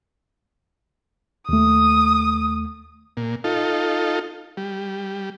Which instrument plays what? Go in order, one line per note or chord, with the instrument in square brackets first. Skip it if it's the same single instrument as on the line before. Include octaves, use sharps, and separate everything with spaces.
[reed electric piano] D#2 A3 [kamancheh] D#6
[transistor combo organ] A#2
D#4 F4 A4
G3